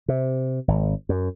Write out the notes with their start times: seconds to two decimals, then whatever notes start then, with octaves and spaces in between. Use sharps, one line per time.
0.08 C3
0.68 G#1
1.09 F#2